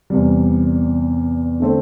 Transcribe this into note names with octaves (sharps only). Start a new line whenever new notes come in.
E2 C3 G3
D3 A3 C4